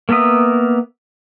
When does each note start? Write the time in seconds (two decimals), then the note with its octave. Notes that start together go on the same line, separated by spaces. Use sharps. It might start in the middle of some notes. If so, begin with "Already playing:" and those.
0.09 A#3 B3 A#4 E5 D#6